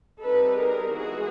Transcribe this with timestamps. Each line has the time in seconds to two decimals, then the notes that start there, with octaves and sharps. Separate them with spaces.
0.22 G3 C4 D#4 A4 B4
0.58 G#4 A#4
0.94 E3 G#3 B3 F#4 G#4